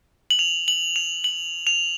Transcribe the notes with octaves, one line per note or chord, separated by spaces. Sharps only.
F#7
F7
F#7
F7
F#7
F7